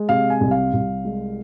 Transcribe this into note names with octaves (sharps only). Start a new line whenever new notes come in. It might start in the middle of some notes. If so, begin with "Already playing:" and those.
Already playing: G#3
C3 F5
G#5
C2
F5
C2
G#3